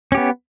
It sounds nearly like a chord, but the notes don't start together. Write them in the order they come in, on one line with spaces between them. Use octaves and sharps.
C#4 G4 B3